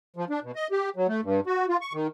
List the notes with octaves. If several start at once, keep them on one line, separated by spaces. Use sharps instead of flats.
F3
D4
B2
D#5
G4
F#3
A3
G2
F#4
F4
C#6
D#3